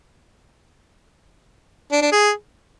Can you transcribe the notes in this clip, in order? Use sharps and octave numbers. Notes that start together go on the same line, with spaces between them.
D4
D4
G#4